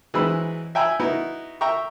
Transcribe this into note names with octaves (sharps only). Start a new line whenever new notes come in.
E3 F#3 G#3 C4 B5 E6
E5 G5 G#5 A#5 B5 E6
B3 D#4 E4 F#4
E5 G5 A#5 C#6